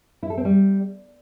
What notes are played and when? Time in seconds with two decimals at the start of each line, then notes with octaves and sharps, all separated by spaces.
0.23 E4
0.30 A4
0.37 C4
0.45 G3